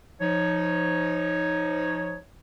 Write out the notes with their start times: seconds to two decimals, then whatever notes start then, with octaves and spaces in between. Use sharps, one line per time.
0.20 F3 D#4 C#5